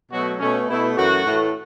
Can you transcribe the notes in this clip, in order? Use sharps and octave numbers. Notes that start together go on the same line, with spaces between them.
B2 F#3 A3 F#4
B2 A3 C#4
B2 A3 E4
F#2 E3 A3 F#4
A2 E3 A3